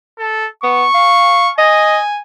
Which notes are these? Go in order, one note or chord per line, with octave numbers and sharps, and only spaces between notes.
A4
B3 C#6
F5
D#5 G#5